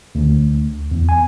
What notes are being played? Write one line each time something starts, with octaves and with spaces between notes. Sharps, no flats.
D2
E2
G#5